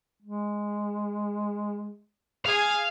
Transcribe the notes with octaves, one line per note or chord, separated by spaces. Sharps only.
G#3
G#4 F5 G#5